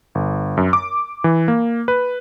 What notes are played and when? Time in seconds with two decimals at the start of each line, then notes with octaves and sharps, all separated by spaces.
0.15 G1
0.57 F#2
0.73 D6
1.24 E3
1.48 A#3
1.88 B4